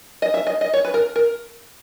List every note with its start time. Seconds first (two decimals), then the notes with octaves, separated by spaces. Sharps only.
0.22 D#5
0.34 E5
0.47 D#5
0.61 D#5
0.74 C#5
0.84 B4
0.94 A#4
1.16 A#4